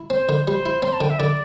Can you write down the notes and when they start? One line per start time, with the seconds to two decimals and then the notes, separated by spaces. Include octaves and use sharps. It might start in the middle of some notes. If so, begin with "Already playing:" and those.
Already playing: E4
0.10 C4 C5
0.29 D3
0.47 G3 C5
0.66 E4
0.82 C4 C6
0.93 A5
1.01 D3 G5
1.10 E5
1.19 D3 D5